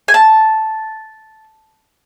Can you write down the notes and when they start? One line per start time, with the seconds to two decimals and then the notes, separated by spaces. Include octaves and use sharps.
0.08 G#5
0.14 A5